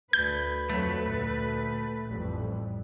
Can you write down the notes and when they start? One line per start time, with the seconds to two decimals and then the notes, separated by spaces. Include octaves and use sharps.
0.13 D2 B4 G6
0.70 F2 F#3 A3
1.04 D2 A#2
2.07 A1 F2 G3